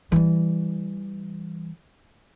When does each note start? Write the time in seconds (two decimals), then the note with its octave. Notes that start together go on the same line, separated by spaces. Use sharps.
0.12 E3 G3